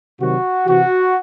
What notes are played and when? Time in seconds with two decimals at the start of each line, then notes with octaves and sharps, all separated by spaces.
0.20 C3 D#3 F#3 F#4
0.67 C3 E3 F#4